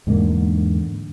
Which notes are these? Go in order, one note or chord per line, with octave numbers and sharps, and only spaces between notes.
E2 G#2 D3 A#3